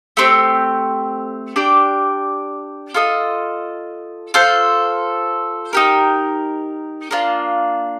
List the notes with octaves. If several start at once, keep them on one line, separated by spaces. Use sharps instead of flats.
A3 C4 G4
D4 G4 D5
F4 A4 D#5
F4 A4 C5
D#4 G4 A#4
A#3 D4 F4